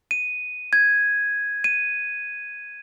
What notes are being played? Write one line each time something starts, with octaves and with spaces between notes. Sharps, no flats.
D#7
G#6
D#7